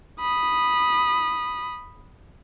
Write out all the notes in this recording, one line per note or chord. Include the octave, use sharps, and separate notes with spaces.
B5 D#6